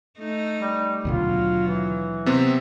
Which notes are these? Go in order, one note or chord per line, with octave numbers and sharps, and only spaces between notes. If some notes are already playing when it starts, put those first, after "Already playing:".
A3 D#4
G3
D#2 B2 D3 F#3 F4
E3
C3 B3 C4